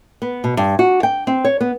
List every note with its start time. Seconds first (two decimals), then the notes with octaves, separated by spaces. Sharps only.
0.22 B3
0.44 B2
0.57 G2
0.79 F#4
1.03 G5
1.27 C4
1.45 C#5
1.61 B3